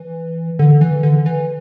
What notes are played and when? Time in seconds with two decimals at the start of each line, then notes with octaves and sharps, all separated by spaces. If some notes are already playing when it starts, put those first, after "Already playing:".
Already playing: E3
0.59 D3
0.81 E3
1.03 D3
1.26 E3